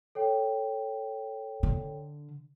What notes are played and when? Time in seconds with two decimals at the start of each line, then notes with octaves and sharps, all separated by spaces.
0.15 A4 C#5 G5
1.63 D3